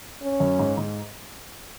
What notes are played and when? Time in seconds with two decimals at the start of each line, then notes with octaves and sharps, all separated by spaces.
0.22 C#4
0.40 F#2
0.59 G#2
0.78 G#2